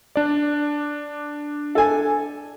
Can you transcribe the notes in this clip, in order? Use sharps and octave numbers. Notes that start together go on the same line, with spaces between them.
D4 D5
A4 G#5